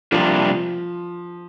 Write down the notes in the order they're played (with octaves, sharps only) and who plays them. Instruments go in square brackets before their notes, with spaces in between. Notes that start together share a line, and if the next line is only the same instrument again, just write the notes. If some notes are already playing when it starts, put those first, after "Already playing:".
[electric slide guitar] C3 G3 A#3 D4 F4 [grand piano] F3